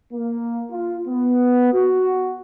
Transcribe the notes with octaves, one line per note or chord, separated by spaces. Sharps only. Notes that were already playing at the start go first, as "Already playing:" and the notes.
A#3
F4
B3
F#4